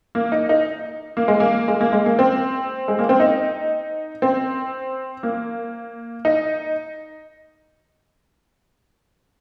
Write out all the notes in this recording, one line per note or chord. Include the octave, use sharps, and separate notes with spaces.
A#3
D#4
D#4
A#3
G#3
A#3
G#3
A#3
G#3
A#3
C4
G#3
A#3
C4
D#4
C4
A#3
D#4